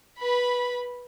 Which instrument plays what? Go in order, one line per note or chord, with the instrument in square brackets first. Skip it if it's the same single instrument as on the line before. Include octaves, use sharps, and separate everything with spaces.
[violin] B4 B5